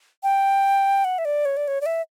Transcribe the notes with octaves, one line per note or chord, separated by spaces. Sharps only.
G5
F#5
E5
D5
C#5
D5
C#5
D5
E5